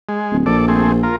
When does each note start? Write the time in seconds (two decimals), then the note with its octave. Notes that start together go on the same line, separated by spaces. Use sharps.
0.09 G#3
0.32 D1
0.46 A#1 A4 D5
0.68 A3 C4 G#4
1.03 F4 A#4